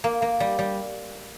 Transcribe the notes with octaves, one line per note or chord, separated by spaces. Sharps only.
A#3
A#3
G3
G3